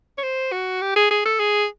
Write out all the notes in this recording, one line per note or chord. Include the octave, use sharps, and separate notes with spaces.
C#5
C5
F#4
G4
G#4
G#4
A4
G#4